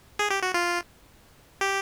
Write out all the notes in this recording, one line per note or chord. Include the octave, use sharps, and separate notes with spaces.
G#4
G4
F#4
F4
G4